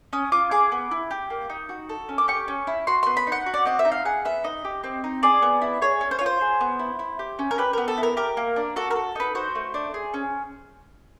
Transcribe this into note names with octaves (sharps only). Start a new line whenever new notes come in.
C#4 D#6
F4 D6
G#4 D6
B3
E4
G4
A#3
D#4
F#4
A4
C#4
D6
G4 C#6
C#4
E4
F#4 C6
B3 C6
B5
D#4
F#5
F#4
D5
C4 D#5
E5
D#4
F5
G#4 F#5
B3 E5
D#4 D#5
G4
C4
D#4
G#4 D5
B3
E4
G#4 C#5
C#4
C5
F4 C#5
C5
G#4
B3
E4
E4
G4
C#4
A#4
G4 B4
B3 A#4
A4
E4
A#4
G4 A#4
A#3
D4
F#4 A4
A#4
A4
D#4 B4
F#4 C5
A3
D4
G#4
C#4